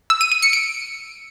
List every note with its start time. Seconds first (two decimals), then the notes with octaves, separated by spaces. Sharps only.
0.10 E6
0.21 D#7
0.32 D#7
0.42 C#7
0.53 D7